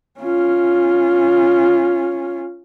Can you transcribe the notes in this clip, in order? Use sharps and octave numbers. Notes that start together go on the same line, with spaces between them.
C#4 F4